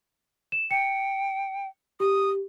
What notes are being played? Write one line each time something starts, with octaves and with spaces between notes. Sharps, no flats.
E7
G5 C#7
G4 D#6